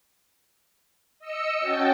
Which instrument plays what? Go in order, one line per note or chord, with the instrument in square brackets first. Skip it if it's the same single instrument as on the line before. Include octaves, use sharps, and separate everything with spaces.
[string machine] D#5 E6 C#7
C#4 F#4 G5 A5